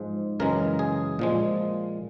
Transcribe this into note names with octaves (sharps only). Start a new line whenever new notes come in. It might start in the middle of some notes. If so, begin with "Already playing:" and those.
Already playing: G#2 F3 G#3
F#2 C#3 E3 G#3 A#4
G#4
A#2 F3 G#3